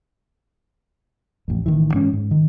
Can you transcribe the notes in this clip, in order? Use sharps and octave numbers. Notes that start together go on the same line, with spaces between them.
A1 F2
A1 D#3 E3
G#2 E3 C#4
G#2
D#3